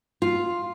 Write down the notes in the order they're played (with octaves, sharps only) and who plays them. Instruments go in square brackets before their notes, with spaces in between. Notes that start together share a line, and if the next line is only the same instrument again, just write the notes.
[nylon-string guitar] F4